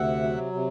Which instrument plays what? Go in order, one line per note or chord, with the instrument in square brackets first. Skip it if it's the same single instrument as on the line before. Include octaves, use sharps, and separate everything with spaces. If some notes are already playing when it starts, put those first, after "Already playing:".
Already playing: [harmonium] D2 C3 E5 F#5
F#3
C3